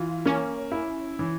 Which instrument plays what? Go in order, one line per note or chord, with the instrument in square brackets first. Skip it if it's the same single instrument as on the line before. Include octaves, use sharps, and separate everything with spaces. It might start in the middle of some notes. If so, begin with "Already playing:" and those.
Already playing: [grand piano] E3 [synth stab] F4
[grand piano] A#3 [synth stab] C#4
[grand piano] E4
E3